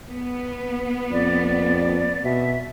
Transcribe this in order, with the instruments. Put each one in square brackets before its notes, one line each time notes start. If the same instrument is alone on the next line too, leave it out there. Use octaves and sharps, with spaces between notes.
[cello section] B3
[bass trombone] F2 [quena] D5
[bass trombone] B2 [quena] E5